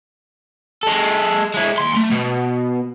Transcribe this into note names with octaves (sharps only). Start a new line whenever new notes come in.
G#3 A4
G#3 E4
D#2 C6
A3
B2